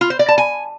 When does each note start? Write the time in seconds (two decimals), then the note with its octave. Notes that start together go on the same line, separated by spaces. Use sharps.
0.01 F4
0.10 C5
0.19 D5
0.28 A5
0.38 G#5